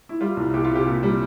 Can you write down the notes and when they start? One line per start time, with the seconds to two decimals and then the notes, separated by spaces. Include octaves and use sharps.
0.09 E4
0.20 G3 F4
0.37 C2
0.54 C2 G4
0.65 F4
0.70 C3
0.75 G4
0.86 A#2
1.03 G3